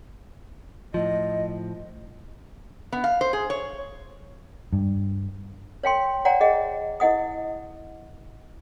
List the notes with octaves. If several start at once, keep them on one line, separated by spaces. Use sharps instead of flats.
A2 F3 D#5
B3
F5
C5
G#4
C#5
G2
C#5 F5 G5 C6
C#5 D5 F#5 G5 A#5
G#4 D#5 F#5
E4 D#5 F#5 D#6